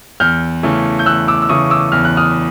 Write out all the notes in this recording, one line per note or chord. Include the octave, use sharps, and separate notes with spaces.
E2 F6 G6
C#3 E3 A3
G6
E2 E6 F#6
D6 E6
E6
C#3 E3 A3 C#6 D#6
D6 E6
E2 F6
F#6
D#6 F6